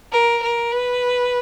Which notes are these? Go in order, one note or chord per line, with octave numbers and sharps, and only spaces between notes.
A#4
A#4
B4